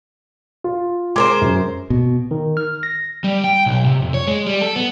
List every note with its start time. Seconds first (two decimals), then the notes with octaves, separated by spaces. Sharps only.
0.64 F4
1.16 G#3 A#4 C5 D6
1.41 F#2
1.90 B2
2.31 D#3
2.57 F6
2.83 A#6
3.24 G3
3.44 G5
3.66 B1
3.86 C3
4.02 F2
4.14 C#5
4.28 G#3
4.46 G3
4.61 A4
4.76 B3